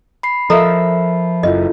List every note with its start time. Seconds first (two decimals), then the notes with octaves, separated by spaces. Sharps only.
0.23 B5 C7
0.50 F3 A4 A#4 D#5 E5 A#5
1.43 F#1 F#2 E4 F4 A4 D#5